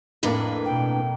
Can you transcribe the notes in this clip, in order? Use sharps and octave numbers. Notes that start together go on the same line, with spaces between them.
F2 A2 A#3 D4 B4
B2 G5